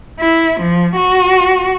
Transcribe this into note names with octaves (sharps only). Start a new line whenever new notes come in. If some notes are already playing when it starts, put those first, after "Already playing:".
E4
F3
F#4